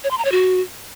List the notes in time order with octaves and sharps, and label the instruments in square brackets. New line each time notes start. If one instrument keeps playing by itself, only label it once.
[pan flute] C#5
C6
A#5
C#5
F#4